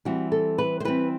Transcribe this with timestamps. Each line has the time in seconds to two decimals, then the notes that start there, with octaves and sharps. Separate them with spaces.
0.05 E3 G3 C4 F#4
0.32 A4
0.58 B4
0.80 C5
0.85 E3 G3 C4 B4